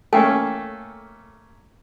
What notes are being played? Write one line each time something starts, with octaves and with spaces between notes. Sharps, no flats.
A3 A#3 C#4 A4 G5 G#5